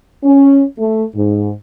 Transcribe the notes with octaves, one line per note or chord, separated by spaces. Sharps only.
C#4
A3
G#2